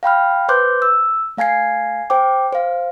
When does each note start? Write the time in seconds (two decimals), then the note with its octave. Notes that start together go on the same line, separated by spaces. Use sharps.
0.03 F5 G5 B5 F6
0.49 B4 C5 C6 D6 F#6 G6
0.82 E6
1.37 A3 F5 G#5 G#6 C7
2.10 C5 G5 D6
2.53 C5 F5